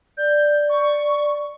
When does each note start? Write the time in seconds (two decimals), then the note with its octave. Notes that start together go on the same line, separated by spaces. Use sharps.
0.17 D5 G6
0.70 C#6